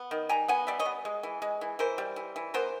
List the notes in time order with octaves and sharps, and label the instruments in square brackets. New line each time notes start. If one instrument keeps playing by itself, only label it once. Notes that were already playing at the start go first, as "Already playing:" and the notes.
Already playing: [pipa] B3
D#3
G3 G#5 A#5
B3 F#5 G#5
G3 D5 E5
C#5 D#5
B3
G#3
E3
G#3
E3
E3 A#4 C5
G3
E3
E3
B3 A#4 C5